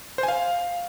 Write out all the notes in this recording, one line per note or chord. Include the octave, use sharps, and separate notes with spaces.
C5
G#5
F5